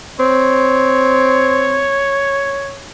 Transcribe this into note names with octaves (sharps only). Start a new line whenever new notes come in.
C4 C#5